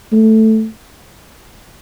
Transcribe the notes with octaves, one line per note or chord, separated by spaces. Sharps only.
A3